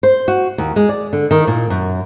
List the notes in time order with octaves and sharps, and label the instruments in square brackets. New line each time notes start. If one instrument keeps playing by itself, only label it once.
[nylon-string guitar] C5
F#4
D#2
G#3
D5
D3
D#3
A#2
F#2